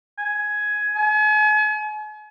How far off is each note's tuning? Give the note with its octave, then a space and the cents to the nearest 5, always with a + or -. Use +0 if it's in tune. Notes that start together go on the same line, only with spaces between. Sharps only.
G#5 +10
G#5 +40